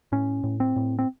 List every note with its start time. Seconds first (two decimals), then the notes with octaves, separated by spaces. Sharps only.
0.12 A2 C#4
0.44 A2
0.60 C4
0.76 A2
0.99 C4